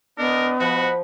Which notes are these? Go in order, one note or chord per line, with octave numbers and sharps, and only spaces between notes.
B3 D4 A#4 D#5
F3 F#4 D#5 F#5 B5